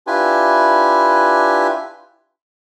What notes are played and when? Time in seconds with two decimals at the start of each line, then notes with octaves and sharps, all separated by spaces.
0.07 D4 E4 F4 G4 B4 G#5